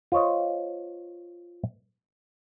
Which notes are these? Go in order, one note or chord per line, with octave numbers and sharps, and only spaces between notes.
F4 C5 C#5 D#5